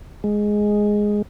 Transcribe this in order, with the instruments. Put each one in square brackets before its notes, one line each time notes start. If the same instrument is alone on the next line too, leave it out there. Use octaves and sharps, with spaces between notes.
[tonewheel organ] G#3